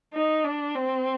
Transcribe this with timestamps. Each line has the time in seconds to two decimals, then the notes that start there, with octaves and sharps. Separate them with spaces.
0.13 D#4
0.44 D4
0.75 C4